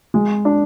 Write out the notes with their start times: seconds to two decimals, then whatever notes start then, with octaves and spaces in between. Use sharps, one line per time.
0.14 G#3
0.45 D4